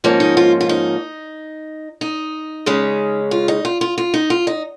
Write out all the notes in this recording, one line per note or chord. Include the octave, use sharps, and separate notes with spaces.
G#2 F3 A#3 C#4
D#4
F4
F4
D#4
D#4
C#3 G#3 C#4
F4
D#4
F4
F4
F4
D#4
F4
D#4